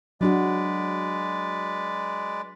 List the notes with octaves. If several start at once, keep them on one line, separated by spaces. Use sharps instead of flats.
F#3 G#3 D4 F#4 B4 D5